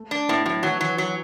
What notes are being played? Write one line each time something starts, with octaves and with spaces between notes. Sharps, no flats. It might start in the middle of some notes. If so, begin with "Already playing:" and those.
Already playing: A3
D4
A2 B3
A2 F#3
E3 F#3
E3 F#3
F#3